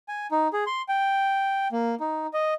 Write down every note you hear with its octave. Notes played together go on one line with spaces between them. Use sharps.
G#5
D#4
G#4
C6
G5
A#3
D#4
D#5